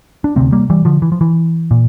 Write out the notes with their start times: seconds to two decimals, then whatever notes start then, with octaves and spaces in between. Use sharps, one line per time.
0.24 D4
0.36 D2 C3 A3 C4
0.52 G3 A#3
0.70 E3 G3
0.85 D3 F3
1.02 E3
1.12 F3
1.21 E3
1.71 A#2